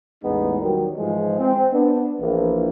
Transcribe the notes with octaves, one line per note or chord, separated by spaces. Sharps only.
A1 E2 G#3 B3 D#4
D#3 F#3 G3
G#2 E3 F3 G#3
C4
B3 D4
A#1 E3